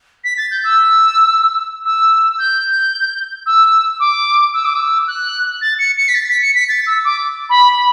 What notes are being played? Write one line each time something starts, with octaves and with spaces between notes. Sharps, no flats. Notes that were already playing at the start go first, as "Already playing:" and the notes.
B6
A6
G6
E6
E6
G6
E6
D6
E6
D6
E6
F#6
A6
C#7
C#7
B6
A6
B6
C#7
B6
A6
E6
D6
B5
B5